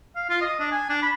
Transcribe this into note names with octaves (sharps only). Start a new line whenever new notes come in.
F5
F4
D#5
D4
G#5
D4
B5